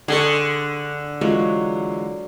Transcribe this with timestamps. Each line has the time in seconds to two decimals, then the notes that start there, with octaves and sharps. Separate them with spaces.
0.08 D3 G#4 C6 C#6
1.21 E3 F#3 G#3 F4